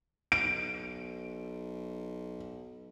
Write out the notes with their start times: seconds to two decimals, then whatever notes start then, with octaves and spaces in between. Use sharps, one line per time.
0.32 B1 D7